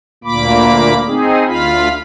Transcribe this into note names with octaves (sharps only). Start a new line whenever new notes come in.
D2 A#2 A#3 B5 D6
C4 D#4 G#4
D2 F4 F5 B5